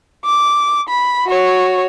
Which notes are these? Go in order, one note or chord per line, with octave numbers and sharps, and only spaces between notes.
D6
B5
F#4 C#5